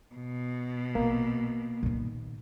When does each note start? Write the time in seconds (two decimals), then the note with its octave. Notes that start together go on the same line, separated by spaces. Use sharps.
0.15 B2
0.95 A#1 A#3
1.83 A#2 D#3